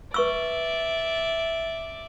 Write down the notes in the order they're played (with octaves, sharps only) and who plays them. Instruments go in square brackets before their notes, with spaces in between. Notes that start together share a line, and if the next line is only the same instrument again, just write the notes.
[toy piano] B4 C#6 E6 [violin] D5 E5